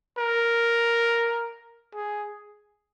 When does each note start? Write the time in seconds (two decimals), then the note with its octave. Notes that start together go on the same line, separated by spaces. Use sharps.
0.18 A#4
1.94 G#4